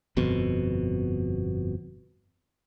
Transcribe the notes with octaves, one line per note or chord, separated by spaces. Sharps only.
G1 F2 B2